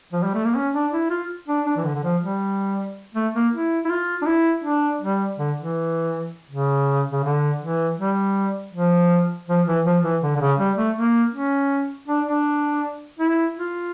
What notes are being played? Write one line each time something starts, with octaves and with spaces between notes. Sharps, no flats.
F3
G3
A3
A#3
C#4
D4
E4
F4
D4
D4
E3
D3
D3
F3
G3
A3
A#3
E4
E4
F4
D4
E4
D4
G3
D3
E3
C#3
C#3
D3
E3
G3
F3
F3
E3
F3
E3
D3
D3
C#3
G3
A3
A#3
C#4
D4
D4
E4
F4